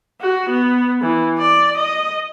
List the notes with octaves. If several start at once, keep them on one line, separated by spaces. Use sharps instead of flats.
F#4
B3
E3
D5
D#5